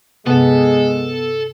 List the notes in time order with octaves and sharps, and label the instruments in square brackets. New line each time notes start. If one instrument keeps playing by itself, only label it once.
[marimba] G2 C3 [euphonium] G#3 [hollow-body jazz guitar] B3 [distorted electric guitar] A4